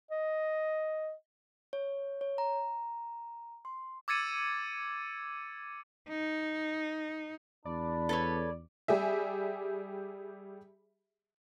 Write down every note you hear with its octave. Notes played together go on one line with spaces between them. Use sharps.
D#5
C#5
C#5
A#5
C6
D6 E6 G#6 A6 C#7 D#7
D#4
E2 D4 D5 B5
A4 B4 C#5
G3 G4 G#4 E5